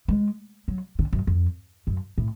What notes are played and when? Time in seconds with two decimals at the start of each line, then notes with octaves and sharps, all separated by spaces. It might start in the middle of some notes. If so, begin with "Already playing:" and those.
0.08 G#3
0.68 F#3
0.99 D3
1.13 F#2
1.27 F2
1.87 F#2
2.18 A2